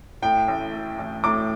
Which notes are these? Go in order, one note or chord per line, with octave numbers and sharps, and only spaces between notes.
A2 G5
A1
A3
A1
A2 D6